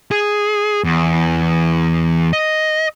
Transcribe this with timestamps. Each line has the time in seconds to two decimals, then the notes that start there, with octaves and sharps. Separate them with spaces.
0.11 G#4
0.84 E2
2.33 D#5